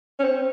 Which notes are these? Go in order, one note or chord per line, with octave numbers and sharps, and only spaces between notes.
C#4
C4